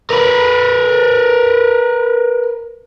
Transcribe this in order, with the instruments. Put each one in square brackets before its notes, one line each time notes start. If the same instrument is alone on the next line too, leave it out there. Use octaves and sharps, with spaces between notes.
[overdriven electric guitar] A#4 B4